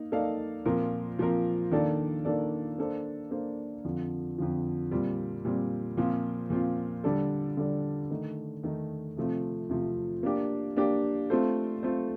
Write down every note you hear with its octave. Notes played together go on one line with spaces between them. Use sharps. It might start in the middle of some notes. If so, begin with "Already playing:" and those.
Already playing: A#3 D#4
A#3 D#4 A4 D5 F5
A#2 F3 C4 F4 A#4
A#2 F3 C4 F4 A#4
D#3 A#3 D4 A4 D5
D#3 A#3 D4 A4 D5
A#3 D4 A4 C5
A#3 D4 A4 C5
F2 D3 F3
F2 D3 F3
A#2 G3 C4
A#2 G3 C4
A#2 F3 C4 F4
A#2 F3 C4 F4
D3 G3 D4 A4 D5
D3 G3 D4 A4 D5
D#3 A3 D#4
D#3 A3 D#4
C3 F3 A3 C4
C3 F3 A3 C4
A#3 D4 G4
A#3 D4 G4
A3 C4 F4 A4 C5
A3 C4 F4 A4 C5